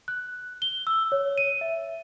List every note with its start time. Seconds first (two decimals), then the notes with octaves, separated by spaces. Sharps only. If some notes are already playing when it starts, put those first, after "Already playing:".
0.08 F#6
0.62 G7
0.87 E6
1.12 C#5
1.38 D#7
1.61 E5